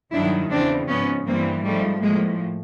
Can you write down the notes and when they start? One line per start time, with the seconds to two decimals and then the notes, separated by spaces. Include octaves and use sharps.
0.13 G2 D#3 F#3 D4 E4
0.51 E2 C#3 E3 C4 D4
0.89 G#2 F3 B3 C#4
1.26 G2 E3 G3 A#3 C4
1.64 G#2 F3 G3 A3
2.02 A2 F3 G#3 A#3